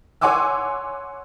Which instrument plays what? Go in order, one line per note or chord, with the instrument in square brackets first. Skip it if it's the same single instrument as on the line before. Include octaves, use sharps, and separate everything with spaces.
[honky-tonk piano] C#5 F#5 G#5 C6 D6 E6